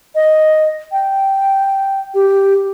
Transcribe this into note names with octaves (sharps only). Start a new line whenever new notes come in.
D#5
G5
G4